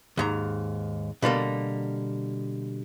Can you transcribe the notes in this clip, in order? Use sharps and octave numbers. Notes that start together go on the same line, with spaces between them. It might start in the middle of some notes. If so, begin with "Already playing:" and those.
D#2 G#2 A#5
B2 D3 G3 A#3